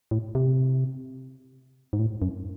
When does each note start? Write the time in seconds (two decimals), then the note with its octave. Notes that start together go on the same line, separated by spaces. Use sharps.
0.11 A2
0.35 C3
1.93 G#2
1.99 A2
2.22 F#2